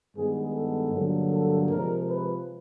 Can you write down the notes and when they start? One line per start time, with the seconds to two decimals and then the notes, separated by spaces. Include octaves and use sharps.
0.15 G2 D#3 G#3 B3 G#4
0.53 A4
0.92 G2 D3 F#3 A#3
1.31 A4
1.69 C3 F3 G#3 A#4
2.07 B4